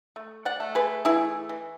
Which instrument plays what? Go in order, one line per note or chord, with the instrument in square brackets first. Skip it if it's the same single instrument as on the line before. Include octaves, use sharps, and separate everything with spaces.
[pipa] A3
D5 F#5
A3
G#4 B4
E3 E4 G#4
E3